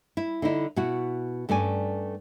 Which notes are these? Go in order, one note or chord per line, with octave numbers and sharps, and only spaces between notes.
E4
D3 D#4 E4
B2 E4 F#4
G2 A3 C#4 D5 G#5